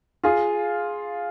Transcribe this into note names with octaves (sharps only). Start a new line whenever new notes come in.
F4 G#4